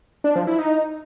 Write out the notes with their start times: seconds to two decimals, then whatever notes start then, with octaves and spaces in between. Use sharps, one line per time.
0.24 D4
0.36 F3
0.47 E4
0.59 D#4